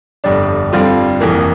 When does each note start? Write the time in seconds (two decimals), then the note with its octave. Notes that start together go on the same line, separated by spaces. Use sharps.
0.24 G1 F2 C3 G3 D4
0.73 G2 D3 G3 C4 F4
1.20 F1 F2 E3 A#3